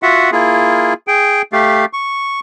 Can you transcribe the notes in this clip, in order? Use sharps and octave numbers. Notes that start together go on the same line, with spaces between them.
F4 F#4 E5 F#5
A#3 E4 F4 G#4
G#4 G5
A3 G4 F5
C#6